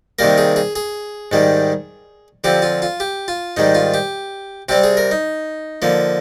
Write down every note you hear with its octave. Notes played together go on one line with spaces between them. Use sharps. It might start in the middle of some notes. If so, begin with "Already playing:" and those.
C3 D#3 G3 A#3 A#4
G#4
G#4
G#4
G#2 D#3 G3
D3 F3 C4 G4
F4
F4
G4
F4
G#2 D#3 G3 D#4
F4
G4
C3 G3 C4 G4
G#4
A#4
D#4
D3 F3 A#3